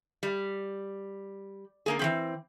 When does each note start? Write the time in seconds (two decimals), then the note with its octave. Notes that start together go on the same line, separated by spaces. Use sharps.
0.23 G3
1.86 D3 A#3 G#4
1.99 E3 F3 C4